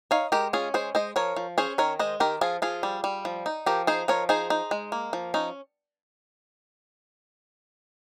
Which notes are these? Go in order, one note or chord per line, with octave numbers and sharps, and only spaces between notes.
D#4 C#5 F5
G#3 G4 A#4
C#4 F4 G#4
G#3 G#4 C5
G#3 C5 D#5
F3 A#4 C#5
F3
C#4 G#4 C5
D#3 A#4 C#5
G#3 C5 D#5
D#3 G4 A#4
F3 F4 G#4
F3 F4 G#4
G3
G3
F3
D#4
F3 G4 A#4
D#4 G#4 C5
F3 A#4 C#5
D#4 G#4 C5
D#4
G#3
A#3
F3
C#4 D#4